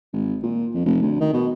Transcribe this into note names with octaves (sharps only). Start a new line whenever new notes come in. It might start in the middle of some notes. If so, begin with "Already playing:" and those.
G#1
A#2
F2
F1
D2
D#3
B2